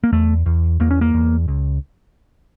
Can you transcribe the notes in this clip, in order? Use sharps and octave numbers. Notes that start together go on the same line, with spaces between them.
A#3
E2 A3
E2
E2 A#3
C#4
A#3
E2
C#2